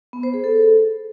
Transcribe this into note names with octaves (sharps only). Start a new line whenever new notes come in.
B3
C5
G#4
A4